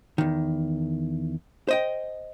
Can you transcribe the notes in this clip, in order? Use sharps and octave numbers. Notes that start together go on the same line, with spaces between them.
E2 D#3
C5 D#5 G5